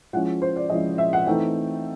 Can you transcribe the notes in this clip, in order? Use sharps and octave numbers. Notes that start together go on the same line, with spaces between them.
F3 G#3 C#4 E4 F#5
C5
D5
F3 G#3 C#4 E4 D#5
E5
F#5
E3 A3 C4 D#4 G5